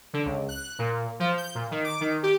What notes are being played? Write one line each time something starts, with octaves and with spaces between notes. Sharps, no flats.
D3
C#2
F#6
A#2
F3
G6
A#2
D#3
D6
D#3
G4